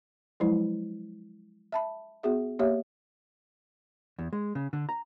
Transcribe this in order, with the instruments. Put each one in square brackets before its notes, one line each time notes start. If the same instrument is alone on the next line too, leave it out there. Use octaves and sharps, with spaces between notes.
[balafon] F3 F#3 G#3 E4
E5 A5 B5
B3 F#4 G#4 E5
A#3 G4 C#5 E5
[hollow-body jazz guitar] E2
G#3
C#3
D3
A#5